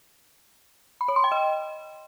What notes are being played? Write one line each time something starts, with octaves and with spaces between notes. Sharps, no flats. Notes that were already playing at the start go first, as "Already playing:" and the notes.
B5
C#5
C6
G5
D#5